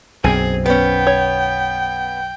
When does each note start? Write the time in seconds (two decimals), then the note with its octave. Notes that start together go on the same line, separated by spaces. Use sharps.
0.24 B1 F#2 C4 G#4 G#5
0.66 B3 C#4 G5
1.07 C#5